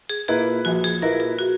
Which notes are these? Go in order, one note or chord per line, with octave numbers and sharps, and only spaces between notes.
G#4
A#2 A#3 E4 G#4 B4
A#1 F#4
G#4
A#2 A#3 E4 A#4 B4
G#4
F#4